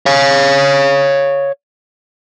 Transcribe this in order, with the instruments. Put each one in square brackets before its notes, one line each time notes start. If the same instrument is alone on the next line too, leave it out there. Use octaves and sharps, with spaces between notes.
[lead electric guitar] C#5 F5